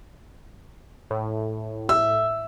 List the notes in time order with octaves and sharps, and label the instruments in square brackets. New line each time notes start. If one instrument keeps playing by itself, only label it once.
[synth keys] A2
[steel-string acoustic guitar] E5 [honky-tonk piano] E6